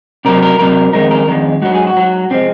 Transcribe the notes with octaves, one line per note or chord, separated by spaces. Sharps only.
C3 F#3 A#4
A#4
C3 F#3 A#4
F2 D#3 G#3 A#4
A#4
F2 D#3 G#3
G#2 F#3 F#4
G#4
F#4
G#2 F#3
C3 F3 G#3 C4